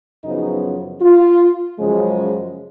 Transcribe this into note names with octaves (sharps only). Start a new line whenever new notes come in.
F#2 C#3 F3 B3 D#4
F4
F#2 C#3 F3 G#3